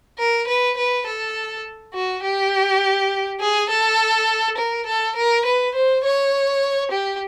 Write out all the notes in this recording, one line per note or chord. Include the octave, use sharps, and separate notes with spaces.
A#4
B4
B4
A4
F#4
G4
G#4
A4
A#4
A4
A#4
B4
C5
C#5
G4